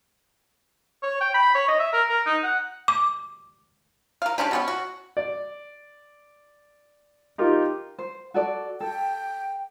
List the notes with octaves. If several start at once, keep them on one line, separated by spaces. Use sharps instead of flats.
C#5
G5
B5
C#5
D#5
E5
A#4
A#4
D#4
F#5
D6
A#4 F5
G#3 C#4 D4 G4
B2 B3 C#4
F#4
D5
D#4 F4 G4 A#4
C5
F#4 A4 D5
A4 G5